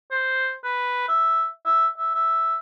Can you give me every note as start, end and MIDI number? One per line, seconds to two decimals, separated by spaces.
0.11 0.53 72
0.64 1.08 71
1.08 1.46 76
1.65 1.87 76
1.98 2.14 76
2.15 2.56 76